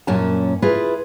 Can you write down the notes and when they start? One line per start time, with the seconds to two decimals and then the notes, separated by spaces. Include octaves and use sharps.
0.07 F#2 A#2 C#4 A5
0.62 E4 F4 G#4 B4